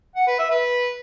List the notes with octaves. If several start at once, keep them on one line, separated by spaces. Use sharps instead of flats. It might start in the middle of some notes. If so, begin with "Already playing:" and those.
F#5
B4
E5
B4